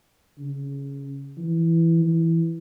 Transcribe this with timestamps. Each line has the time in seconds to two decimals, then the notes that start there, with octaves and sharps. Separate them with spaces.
0.38 C#3
1.38 E3
2.02 E3